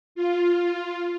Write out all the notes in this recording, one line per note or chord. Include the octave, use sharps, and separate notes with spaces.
F4